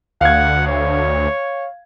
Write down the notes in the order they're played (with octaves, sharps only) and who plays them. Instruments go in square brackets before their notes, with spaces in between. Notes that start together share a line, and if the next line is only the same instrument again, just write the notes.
[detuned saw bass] D2 [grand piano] F5 G#6 [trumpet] F#5
[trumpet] C#5